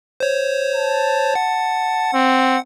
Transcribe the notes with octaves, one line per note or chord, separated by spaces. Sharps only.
C5 C#5
A5
F#5
C4